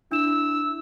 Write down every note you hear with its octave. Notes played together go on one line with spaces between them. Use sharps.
D4 E4 E6 E7